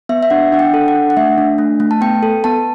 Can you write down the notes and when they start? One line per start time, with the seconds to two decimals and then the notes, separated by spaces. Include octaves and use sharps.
0.09 B3 E5
0.23 E5
0.30 D4 F#5
0.52 D4 F#5
0.59 G5
0.74 A4
0.88 F#5
0.95 D4
1.10 F#5
1.17 A3 E5
1.38 D4
1.58 A3
1.80 A3
1.91 A5
2.01 B3 G5
2.23 A4
2.44 B3 A5